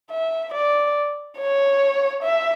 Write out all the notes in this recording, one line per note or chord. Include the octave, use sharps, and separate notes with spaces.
E5
D5
C#5
E5